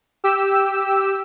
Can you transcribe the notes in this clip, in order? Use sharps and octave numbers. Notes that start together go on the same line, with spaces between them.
G4 E6